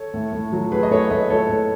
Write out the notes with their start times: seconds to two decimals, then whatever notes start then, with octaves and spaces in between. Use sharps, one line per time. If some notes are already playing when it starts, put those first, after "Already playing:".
Already playing: A4 C#5
0.14 A2
0.33 A2
0.52 F#3
0.72 F#3 G#4 B4
0.83 D#5
0.91 A2 A4 C#5
1.10 A2 B4 D#5
1.30 A2 A4 C#5
1.49 A2